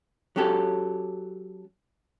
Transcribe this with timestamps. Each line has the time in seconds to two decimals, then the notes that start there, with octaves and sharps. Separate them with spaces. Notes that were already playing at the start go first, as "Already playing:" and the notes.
0.36 F#3 C#4 G4 A4